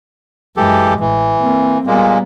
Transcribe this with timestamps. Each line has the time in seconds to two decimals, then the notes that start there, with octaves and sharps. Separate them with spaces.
0.57 F#2 E3 G#3 G4 A4
1.00 A1 E3
1.41 A#3 C4
1.87 A#2 G3 G#3 A#3 B3